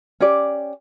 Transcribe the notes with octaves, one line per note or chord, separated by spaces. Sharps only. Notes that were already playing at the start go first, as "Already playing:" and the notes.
C#4 G4 D5